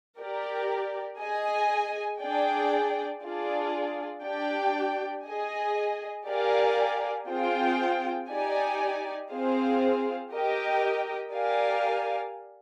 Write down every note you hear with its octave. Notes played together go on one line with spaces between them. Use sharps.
G4 A#4 D5
G#4 D#5 G#5
D4 G#4 D5 G5
D4 F4 G#4 D5
D4 G4 D5 G5
G#4 D#5 G#5
G4 A#4 D5 F5 G#5
C4 F4 G#4 C5 G5
D#4 G4 D5 G#5
C4 F4 G#4 C5 F5
G4 A#4 D#5 G5
G4 A#4 D5 F5 G#5